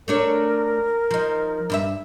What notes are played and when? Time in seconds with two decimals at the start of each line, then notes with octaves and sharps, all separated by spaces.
0.08 A3 D4 A#4 C#5
1.11 F3 D#4
1.70 G2 B4 E5